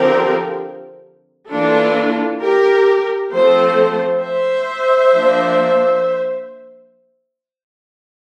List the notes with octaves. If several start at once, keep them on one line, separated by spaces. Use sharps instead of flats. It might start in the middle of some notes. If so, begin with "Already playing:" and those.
Already playing: D3 F3 C4 G4 A#4
E3 A#3 D4 F4 A4
G4 A#4
F3 A3 C4 A4 C5
C5 E5
F3 A#3 D4